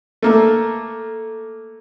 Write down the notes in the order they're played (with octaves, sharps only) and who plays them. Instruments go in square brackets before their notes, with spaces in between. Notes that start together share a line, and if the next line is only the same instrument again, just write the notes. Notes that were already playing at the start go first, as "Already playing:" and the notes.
[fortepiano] A3 A#3 A4